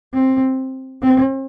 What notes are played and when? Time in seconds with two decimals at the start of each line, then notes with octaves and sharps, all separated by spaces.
0.13 C4
1.02 C4